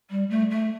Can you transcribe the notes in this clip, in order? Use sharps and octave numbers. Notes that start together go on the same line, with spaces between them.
G3
A3
A3